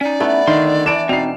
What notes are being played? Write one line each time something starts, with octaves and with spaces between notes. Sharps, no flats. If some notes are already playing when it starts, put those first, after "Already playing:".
C#4 D#4 D5
A3 B3 E4
D3 D#3 C6
E3 A3 D4 D7 E7
B2 C4 D#4 C7 F7